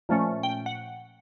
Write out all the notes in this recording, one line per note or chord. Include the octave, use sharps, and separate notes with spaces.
A#2 F3 A3 C#4
G5
F#5